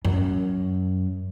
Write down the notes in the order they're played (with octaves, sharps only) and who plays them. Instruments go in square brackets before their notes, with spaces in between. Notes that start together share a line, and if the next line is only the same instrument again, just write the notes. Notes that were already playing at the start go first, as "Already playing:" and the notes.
[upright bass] F#2